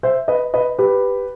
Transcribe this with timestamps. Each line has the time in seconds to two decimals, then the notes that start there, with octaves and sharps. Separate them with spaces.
0.03 C5 E5
0.28 B4 D#5
0.54 B4 D#5
0.79 G4 B4